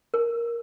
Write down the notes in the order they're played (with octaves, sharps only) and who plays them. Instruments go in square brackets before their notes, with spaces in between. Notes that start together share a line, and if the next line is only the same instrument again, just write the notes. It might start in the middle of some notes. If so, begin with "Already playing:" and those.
[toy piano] A#4